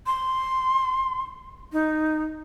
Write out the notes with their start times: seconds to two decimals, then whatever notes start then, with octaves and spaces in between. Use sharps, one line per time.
0.06 C6
1.73 D#4